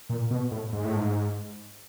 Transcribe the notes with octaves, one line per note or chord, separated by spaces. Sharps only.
A#2
B2
A2
G#2
A2
G#2